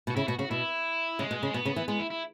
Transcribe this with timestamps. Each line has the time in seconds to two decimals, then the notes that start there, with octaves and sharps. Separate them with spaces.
0.07 B2 F#4
0.16 C#3 E4
0.28 B2 F#4
0.39 C#3 F#4
0.50 B2 E4
1.19 C#3 G#3
1.31 B2
1.43 C#3
1.54 B2 B3
1.65 C#3
1.76 E3
1.88 G#3 B3
1.99 E4
2.10 E4